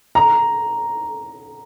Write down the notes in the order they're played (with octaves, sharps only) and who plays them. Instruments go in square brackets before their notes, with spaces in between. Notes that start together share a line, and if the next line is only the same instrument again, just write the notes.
[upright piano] A#5